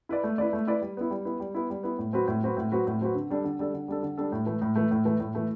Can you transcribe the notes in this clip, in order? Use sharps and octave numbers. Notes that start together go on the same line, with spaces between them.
E4 B4 D5
A3
E4 B4 D5
A3
E4 B4 D5
G3
B3 E4
G3
B3 E4
G3
B3 E4
G3
B3 E4
A2
F#3 C4 F#4 B4
A2
F#3 C4 F#4 B4
A2
F#3 C4 F#4 B4
A2
F#3 C4 F#4 B4
D3
G3 D4 A4
D3
G3 D4 A4
D3
G3 D4 A4
D3
G3 D4 A4
A2
E3 A3
A2
E3 A3
A2
E3 A3
A2
E3 A3